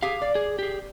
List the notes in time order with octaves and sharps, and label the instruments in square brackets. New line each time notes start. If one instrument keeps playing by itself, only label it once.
[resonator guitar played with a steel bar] G4 G#4 [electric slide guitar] F5
[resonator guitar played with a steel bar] D5
[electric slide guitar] G#4
G4 G#4